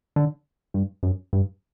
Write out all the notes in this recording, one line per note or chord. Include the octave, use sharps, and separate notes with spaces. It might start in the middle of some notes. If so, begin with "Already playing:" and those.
D3
G2
F#2
G2